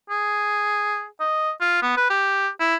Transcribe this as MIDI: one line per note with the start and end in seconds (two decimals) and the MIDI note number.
0.10 1.05 68
1.20 1.51 75
1.61 1.82 65
1.83 1.96 59
1.97 2.06 71
2.10 2.48 67
2.60 2.75 64